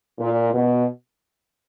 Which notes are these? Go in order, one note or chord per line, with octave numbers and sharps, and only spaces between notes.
A#2
B2